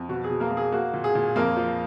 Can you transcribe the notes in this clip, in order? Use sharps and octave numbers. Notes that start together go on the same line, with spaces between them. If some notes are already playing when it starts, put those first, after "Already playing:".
Already playing: F2
B2 F#4
G#4
B2
A#3 A#4
A#3
G#4
A#3 F#4
A#2
G#4
A#2
F2 A#3 A#4
F3